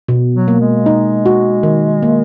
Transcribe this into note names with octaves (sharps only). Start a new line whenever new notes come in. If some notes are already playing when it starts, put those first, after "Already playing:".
B2
F#3
A#3
G#3
D#4
F#4
D#3
A#3